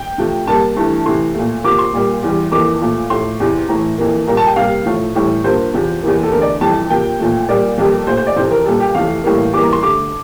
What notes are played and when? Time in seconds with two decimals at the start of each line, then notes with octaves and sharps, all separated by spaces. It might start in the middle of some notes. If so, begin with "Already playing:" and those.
Already playing: G5
0.18 C3 F3 A3
0.47 C3 G3 A#3 A5
0.76 G2 E3 A3
1.06 C3 E3 A3 C6
1.34 A#2 A3
1.64 C3 F3 A#3 D6
1.79 C6
1.93 A#2 G3 A#3
2.23 E2 E3 G3
2.52 F2 E3 A#3 D6
2.81 A#2 F3 A3
3.10 A2 F3 A3 C6
3.40 E2 C3 E3
3.69 A2 E3 A3 A#5
3.98 F2 E3 A#3
4.27 A#2 G3 A#3 A#5
4.37 A5
4.47 G5
4.56 C3 G3 A#3 F5
4.86 A2 F3 A3
5.15 A2 E3 G3
5.44 G2 F3 A#3 C5
5.74 E2 C3 F3
6.03 E2 C3 E3 A#3
6.23 A4
6.32 E2 D3 A3 A#4
6.42 D5
6.61 F2 C3 E3 G3 A5
6.90 C3 F3 A#3 G5
7.19 A#2 F3 A3
7.49 A#2 G3 A#3 D5
7.78 F2 C3 G3 A#3
8.07 A#2 A3 C5
8.17 C5
8.27 D5
8.36 F2 C3 E3 C5
8.51 A#4
8.66 A#2 G3 A#3 A4
8.80 G4
8.95 F2 C3 E3 A3 F5
9.24 A2 E3 G3 A#3
9.53 E2 E3 G3 A#3 D6
9.63 A#5
9.73 C6
9.82 G2 D3 A3 D6